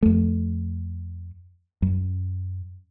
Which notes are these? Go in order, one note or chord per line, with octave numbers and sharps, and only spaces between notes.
F2 A3
F#2